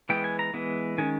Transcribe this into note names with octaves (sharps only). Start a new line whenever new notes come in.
E3 G#3 B3 G5
G#5
A#5
E3 G#3 B3
D#3 G#3 C#4 G#5